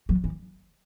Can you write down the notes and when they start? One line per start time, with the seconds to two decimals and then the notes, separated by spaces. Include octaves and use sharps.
0.09 F#3
0.24 E3